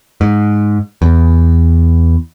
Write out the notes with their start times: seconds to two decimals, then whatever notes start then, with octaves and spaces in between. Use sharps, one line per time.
0.21 G#2
1.02 E2